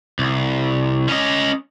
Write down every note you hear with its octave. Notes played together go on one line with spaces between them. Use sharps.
C2
C#4 D#5